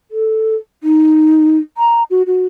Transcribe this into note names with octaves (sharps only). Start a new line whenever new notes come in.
A4
D#4
A#5
F#4
F#4